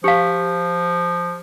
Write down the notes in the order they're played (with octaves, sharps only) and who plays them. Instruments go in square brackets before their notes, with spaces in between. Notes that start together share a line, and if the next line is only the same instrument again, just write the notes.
[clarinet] F3 [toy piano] G4 F5